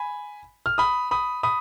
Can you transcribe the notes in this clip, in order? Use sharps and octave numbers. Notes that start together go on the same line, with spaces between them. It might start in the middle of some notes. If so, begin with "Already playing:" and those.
Already playing: G#5 B5
F6
B5 D#6
B5 D#6
B5 D#6